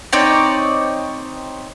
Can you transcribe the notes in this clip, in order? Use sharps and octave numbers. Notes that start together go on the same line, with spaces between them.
C4 D#4 C#5 D5